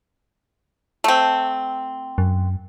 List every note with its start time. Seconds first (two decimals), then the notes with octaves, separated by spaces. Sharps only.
1.04 A3 C4
2.18 F#2